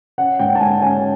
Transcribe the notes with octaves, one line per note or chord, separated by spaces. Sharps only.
C#4 F#5
G#2 G5
A5
G#2 G#5
C#4 G#5